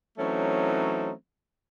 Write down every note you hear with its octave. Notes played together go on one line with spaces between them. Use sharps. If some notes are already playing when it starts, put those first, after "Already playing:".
E3 F#3 A3 C4 C#4 D#4